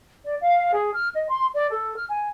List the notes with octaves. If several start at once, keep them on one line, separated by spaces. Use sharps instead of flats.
D5
F5
G#4
F6
D#5
C6
D5
A4
F6
G#5